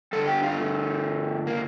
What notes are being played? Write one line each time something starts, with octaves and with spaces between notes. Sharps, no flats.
G2 D3 G3 A4
G4
F4
A3
A#3